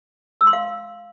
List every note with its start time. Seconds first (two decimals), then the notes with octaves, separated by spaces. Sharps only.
0.41 E6
0.47 C6
0.53 F5